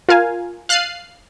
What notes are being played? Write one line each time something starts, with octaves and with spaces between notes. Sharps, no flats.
F4 A#4 F5 G#5
F5 F6 F#6 A6 C7 D#7